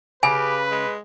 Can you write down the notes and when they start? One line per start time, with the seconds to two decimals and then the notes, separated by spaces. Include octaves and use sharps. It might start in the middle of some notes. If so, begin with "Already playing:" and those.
0.23 C#3 G4 B4 G#5
0.71 G#3